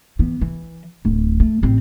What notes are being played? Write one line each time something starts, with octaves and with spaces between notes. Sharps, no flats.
E3 B3
E3
D1
A3
A1 C4